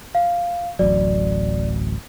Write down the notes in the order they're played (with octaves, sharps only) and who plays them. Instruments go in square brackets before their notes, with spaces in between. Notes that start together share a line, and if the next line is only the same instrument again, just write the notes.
[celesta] F5
[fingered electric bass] D1 A1 F#3 [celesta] D5